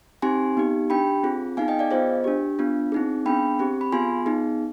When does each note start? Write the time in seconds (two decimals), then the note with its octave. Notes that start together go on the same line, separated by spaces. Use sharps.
0.22 C4 D#4 G4 G#5 C6
0.57 B3 D#4 G4
0.90 D4 G4 G5 B5
1.23 C4 F4 G#4
1.57 B3 D#4 G#4 F5 G#5
1.68 D#5 G5
1.79 D5 F5
1.91 B3 F4 G#4 C5 D#5
2.24 D4 G4
2.59 B3 D4 F4
2.92 C4 D#4 G#4
3.26 B3 D4 G#4 G5 B5
3.59 C4 G4
3.81 B5
3.92 B3 F4 G#4 G#5 C6
4.26 B3 D#4 G#4